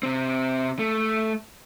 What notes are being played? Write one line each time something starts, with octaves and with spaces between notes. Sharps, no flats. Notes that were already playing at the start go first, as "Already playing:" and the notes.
C3 C4
A3